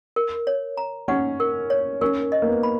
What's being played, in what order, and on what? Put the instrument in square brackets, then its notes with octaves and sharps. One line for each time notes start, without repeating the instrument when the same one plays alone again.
[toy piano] A#4
C#5
A#5
[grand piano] C#4 [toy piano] F#5
[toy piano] A#4
C#5
[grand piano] C#4 [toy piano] A#4
[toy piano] D#5
[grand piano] A#3
B3
[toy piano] B5